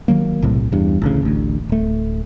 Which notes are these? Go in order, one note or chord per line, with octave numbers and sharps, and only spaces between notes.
D#3 F#3 A#3
B1 A2 C3
E2 G2
A1 D2 C#3
A1 D2
D1 A3